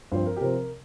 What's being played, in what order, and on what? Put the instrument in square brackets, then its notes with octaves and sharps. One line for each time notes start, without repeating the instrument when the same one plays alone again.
[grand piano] G2 F3 C4 [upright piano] C5
[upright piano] A#4
G4
[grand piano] C3 F3 C4 [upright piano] A#4